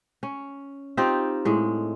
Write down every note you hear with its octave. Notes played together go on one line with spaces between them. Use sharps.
C#4
C4 D#4 F4 G4
A2 G#3